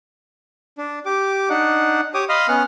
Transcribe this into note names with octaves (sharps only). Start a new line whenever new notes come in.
D4
G4 D6
D4 D#4 F#5
G4 C#5 D6 D#6
D#5 F5 B5 C6 D#6 F6
B3 C#4 F#5 F6